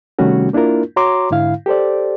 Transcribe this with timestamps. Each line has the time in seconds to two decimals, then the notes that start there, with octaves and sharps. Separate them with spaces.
0.19 C3 D#3 G3 A3 C#4 F#4
0.53 A#3 D4 E4 F4 A#4
0.96 F#4 C#5 A#5 C6 D6
1.31 G#2 D3 E4 F5
1.66 G4 A4 C5 D5